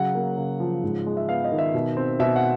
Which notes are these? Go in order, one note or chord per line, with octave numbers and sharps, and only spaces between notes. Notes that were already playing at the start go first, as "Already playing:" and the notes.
Already playing: C#3 F#3 F#5
A#3
C#3
F3
G#2
G#3
E5
B3 F5
D#5
D#3
E5
B2
C4
B2 E5
F#5